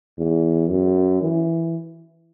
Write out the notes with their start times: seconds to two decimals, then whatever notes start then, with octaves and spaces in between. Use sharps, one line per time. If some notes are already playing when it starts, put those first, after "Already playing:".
0.18 E2
0.70 F#2
1.22 E3